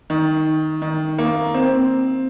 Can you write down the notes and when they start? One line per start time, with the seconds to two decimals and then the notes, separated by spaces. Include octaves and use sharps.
0.10 D#3
0.82 D#3
1.19 A#3
1.54 C4